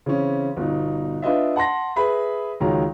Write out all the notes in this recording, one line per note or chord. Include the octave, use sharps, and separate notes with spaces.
C#3 E3 C4 C#4
G1 B2 D#4
D4 F4 B4 D#5 E5
F#5 A5 C6 A#6
G#4 B4 E5 B5
C#2 D#3 F#3 G#3 A#5